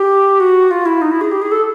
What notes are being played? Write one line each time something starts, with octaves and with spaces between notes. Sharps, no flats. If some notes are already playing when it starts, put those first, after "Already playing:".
Already playing: G4
F#4
F4
E4
D#4
E4
G#4
G4
G#4
A4